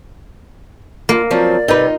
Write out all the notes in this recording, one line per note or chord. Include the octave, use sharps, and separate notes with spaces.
A#3 F4
F3 F#3 C4 D5
C3 D#4 F4 B4